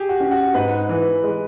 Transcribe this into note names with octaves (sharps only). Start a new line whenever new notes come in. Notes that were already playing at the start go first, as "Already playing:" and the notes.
Already playing: G4 G#4
F#4
C#4
F#4
G#2 B4
E3
G#3